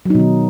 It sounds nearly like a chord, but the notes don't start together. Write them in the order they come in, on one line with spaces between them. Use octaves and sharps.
F#3 D#4 B2 D#3